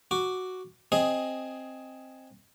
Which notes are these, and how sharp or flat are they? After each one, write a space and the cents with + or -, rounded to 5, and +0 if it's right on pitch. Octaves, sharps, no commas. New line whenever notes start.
F#4 +0 D6 +0
C4 +10 G#4 +10 D#5 +0